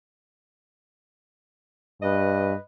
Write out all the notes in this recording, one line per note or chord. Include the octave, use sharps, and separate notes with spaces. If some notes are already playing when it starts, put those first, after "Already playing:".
G2 B4 D#5